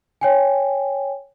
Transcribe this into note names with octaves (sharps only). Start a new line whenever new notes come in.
C#5 G5 G#5